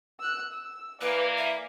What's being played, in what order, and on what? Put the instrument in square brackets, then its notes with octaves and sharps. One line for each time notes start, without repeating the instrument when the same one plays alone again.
[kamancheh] E6 F#6
E6
[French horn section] E3 A#3 [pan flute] B4 [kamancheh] D5
[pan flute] E5